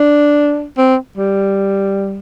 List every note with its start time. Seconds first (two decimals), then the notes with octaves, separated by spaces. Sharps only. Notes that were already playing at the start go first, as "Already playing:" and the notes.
Already playing: D4
0.78 C4
1.18 G3